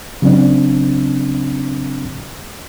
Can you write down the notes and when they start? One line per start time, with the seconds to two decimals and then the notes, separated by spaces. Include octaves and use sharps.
0.22 C#3 F#3 C4 D4